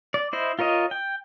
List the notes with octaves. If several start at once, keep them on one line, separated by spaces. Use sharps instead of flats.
D5
E4 C5 D#5
F4 A#4 C#5 D#5
G5